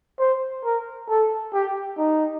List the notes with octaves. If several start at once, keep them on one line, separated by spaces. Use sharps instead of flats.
C5
A#4
A4
G4
D#4